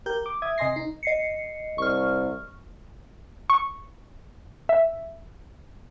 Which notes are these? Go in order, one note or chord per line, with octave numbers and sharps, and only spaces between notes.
G4 A#4 G6
D6
E5 D#6 G#6
C3 D#5 G#5 C6 A#6 C7
D#4 C7
D#5 C7 C#7
C2 C#6 F6
C#6
E5